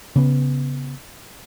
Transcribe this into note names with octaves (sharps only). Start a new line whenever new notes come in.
C#3 B3